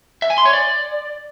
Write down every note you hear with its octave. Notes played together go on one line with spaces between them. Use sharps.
E5
G#5
C6
C#5
D5